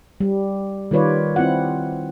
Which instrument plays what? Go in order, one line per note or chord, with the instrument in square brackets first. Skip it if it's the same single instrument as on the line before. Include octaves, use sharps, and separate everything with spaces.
[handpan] G3
D#3 G3 F4 B4 C#5 D5
C4 E4 F4 F#5